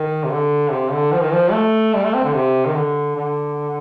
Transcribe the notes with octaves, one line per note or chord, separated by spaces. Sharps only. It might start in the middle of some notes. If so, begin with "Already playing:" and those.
Already playing: D#3
C3
D3
C3
D3
F3
D#3
F3
A3
G3
A3
C4
D3
C3
D#3
D3
D3